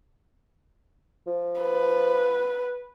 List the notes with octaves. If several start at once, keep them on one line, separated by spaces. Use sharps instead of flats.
F3
B4